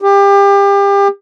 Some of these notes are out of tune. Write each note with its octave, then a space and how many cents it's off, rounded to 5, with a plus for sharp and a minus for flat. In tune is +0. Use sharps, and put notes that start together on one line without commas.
G4 +30